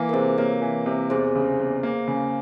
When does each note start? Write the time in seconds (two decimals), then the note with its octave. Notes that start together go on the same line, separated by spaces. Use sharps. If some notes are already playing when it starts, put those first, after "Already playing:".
Already playing: E3 A#3
0.09 A#4
0.13 C3 G#4 C5
0.38 A#3 A#4 C#5
0.62 E3
0.86 C3
1.10 E2 G#4 C5
1.36 C#3
1.59 E2
1.83 A#3
2.08 C#3